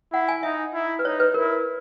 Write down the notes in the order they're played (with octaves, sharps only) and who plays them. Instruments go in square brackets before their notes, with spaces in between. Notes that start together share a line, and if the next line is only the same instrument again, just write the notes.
[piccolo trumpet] E4 [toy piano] F#5
[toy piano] G#5
[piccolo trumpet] D#4 [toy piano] E5
[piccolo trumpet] E4
[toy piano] B4
[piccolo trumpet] D#4 [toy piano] C#5
[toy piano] B4
[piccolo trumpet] E4 [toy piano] A#4